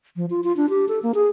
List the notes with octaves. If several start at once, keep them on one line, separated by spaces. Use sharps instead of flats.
F3
F4
F4
D4
G4
A4
A#3
G#4